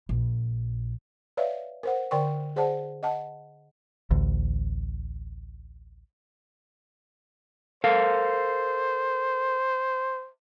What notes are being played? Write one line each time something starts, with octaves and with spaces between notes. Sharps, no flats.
A#1
B4 C#5 D5 E5 F5
A#4 C5 F#5
D3 A#4 D5 G5 C6 C#6
G#4 C5 D5 F#5 A5
D#5 F#5 A5
A1 D2
A4 A#4 C5 F5